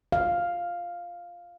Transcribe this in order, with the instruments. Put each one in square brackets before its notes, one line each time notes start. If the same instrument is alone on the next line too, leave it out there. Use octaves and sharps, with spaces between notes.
[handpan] F5